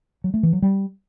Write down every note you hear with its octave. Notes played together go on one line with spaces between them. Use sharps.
F#3
A3
E3
F#3
G3